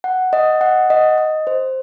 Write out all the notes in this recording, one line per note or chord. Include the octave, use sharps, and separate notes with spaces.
F#5
D#5
F#5
D#5
D#5
C5